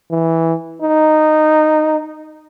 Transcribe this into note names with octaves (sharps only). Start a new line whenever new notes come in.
E3
D#4